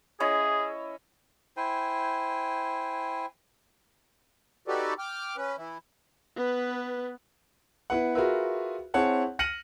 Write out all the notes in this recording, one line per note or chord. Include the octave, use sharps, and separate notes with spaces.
C#4 E4 G#4 D#5
E4 C5 G5 G#5
D#4 F#4 G4 A4 B4 D5
G5 D6 F6
C#4 B4
E3 E4
B3 B4
B3 E4 B4 F#5
F4 F#4 G#4 A#4 B4 E5
C4 E4 G#4 C#5 F#5 A5
F6 A#6 C#7 D#7 F#7